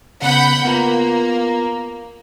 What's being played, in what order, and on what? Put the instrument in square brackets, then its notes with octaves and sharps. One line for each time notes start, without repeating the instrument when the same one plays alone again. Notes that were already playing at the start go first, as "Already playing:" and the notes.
[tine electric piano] C#3 B3 F#6 [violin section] F#5 B5 G6
[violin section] A#3 [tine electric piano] B3 F4